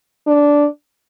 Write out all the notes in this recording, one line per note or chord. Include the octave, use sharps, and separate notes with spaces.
D4